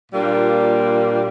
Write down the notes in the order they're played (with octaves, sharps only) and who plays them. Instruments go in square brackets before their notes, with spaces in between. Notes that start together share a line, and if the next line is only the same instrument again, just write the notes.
[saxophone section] A#2 G3 A#3 D4 F4